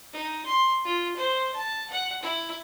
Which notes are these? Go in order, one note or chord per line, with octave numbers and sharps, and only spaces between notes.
D#4
C6
F4
C5
A5
F#5
E4